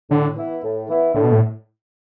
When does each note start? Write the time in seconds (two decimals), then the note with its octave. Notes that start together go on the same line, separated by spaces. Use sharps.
0.10 A2 D3
0.37 E3 B3 E4
0.63 A2
0.89 E3 B3 E4
1.14 A2 D3
1.24 B2
1.32 A2